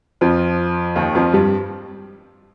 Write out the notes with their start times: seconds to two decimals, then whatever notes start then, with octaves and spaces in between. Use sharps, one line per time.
0.21 F2 F3
0.96 D#2 D#3
1.15 F2 F3
1.33 G2 G3